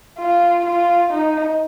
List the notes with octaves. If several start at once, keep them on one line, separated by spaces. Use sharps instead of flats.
F4
F4
D#4